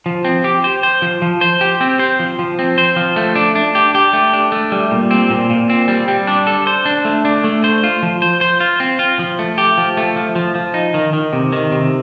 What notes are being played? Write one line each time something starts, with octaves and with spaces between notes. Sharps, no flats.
F3
C4
G4
C5
C5
F3
F3
C5
G4
C4
C5
F3
F3
C4
C5
F3
A3
D4
D4
G4
G4
A3
D4
A3
G3
A#2
C4
A#2
A#2
C4
G3
G3
D4
A4
C5
D4
A3
D4
A3
C5
F4
F3
C5
C5
F4
C4
F4
F3
A3
G4
F3
A3
F3
F3
F3
D#4
D#3
D#3
C3
D#3
C3